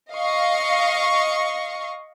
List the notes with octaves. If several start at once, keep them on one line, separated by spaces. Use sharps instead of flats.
D#5 F5 C#6